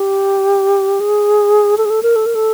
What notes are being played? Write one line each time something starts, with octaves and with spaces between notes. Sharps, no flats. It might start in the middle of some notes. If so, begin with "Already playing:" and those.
Already playing: G4
G#4
A4
G#4
A4
A#4
A4
A#4
A4